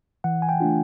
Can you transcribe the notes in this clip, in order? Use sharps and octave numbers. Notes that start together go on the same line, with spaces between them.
E3 F#5
G#5
G5
A3 D4 F4